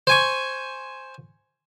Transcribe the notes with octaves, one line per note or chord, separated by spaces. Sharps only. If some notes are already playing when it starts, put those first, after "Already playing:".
C5 G#5 C#6